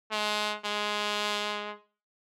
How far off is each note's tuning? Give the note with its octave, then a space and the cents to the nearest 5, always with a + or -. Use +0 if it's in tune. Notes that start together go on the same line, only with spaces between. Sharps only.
G#3 +25
G#3 +5